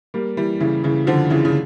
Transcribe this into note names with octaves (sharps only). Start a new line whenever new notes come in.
G3 A#3
E3 G3
C#3 E3
C#3 E3
D3 F3
C#3 E3
C#3